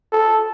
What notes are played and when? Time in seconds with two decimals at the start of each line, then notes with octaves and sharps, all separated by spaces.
0.12 A4